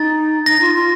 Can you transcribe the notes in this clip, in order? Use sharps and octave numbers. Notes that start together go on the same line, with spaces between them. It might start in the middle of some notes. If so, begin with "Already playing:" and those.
Already playing: D#4 A6
D#4 A#6
F4
F4